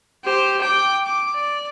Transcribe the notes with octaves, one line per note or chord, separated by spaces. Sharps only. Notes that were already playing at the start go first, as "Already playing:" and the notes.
G4 C5
G5 D6
D6
D5